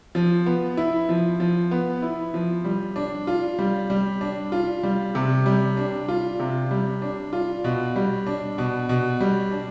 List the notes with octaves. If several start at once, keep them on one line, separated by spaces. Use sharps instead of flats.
F3
B3
E4
F3
F3
B3
E4
F3
G3
D4
F4
G3
G3
D4
F4
G3
C3
G3
D4
F4
C3
G3
D4
F4
B2
G3
D4
B2
B2
G3
D4